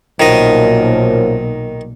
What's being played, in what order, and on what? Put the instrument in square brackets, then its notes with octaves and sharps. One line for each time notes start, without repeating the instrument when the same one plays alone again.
[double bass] B1 A#2 [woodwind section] F#2 F3 [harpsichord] D#3 D#5